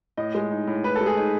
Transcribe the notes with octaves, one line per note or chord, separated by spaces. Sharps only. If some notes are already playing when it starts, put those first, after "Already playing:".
A2 D#5
G#3
D#4
A2
A2 B4
A4
G#3
G#4
D#4